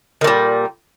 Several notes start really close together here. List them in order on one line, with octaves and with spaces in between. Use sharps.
D#3 A#2 G3